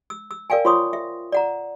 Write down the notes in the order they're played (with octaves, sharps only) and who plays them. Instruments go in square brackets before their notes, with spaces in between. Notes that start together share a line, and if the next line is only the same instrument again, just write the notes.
[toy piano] E6
E6
A#4 D5 F5 G5 G#5
F4 C5 C#5 C6 C#6 D#6
E5
D5 F#5 A#5